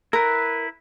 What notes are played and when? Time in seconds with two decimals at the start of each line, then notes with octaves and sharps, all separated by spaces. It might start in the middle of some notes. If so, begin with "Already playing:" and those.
0.13 E4 A#4 B4